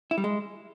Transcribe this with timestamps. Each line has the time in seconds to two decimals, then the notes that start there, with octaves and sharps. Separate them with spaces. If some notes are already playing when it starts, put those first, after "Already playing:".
0.11 E4
0.18 G3
0.24 G#3